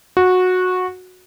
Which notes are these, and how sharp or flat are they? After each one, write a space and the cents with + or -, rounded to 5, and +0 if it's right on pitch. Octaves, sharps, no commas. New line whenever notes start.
F#4 -15